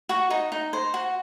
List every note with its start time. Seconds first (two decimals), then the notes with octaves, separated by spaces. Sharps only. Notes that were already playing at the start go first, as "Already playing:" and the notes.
0.09 F#4 C#6
0.30 D#4
0.52 D#4
0.73 C5
0.94 F#4